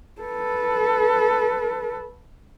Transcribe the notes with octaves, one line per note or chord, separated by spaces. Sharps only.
A4 B4